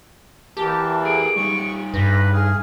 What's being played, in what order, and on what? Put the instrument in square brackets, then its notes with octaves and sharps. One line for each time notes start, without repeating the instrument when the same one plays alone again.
[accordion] E2 E3 A#3 [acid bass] G4 [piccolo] A5
[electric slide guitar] G#4 A4 [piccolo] D7
[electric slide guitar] G3 D#4 [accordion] C#6
[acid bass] G2 [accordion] B4 [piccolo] A#6
[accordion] G#4 [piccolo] F6